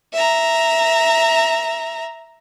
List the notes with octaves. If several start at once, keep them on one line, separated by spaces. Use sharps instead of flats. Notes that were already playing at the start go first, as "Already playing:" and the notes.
E5 A#5